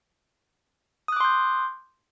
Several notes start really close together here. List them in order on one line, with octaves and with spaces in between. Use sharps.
D#6 F#6 D6 C6 G6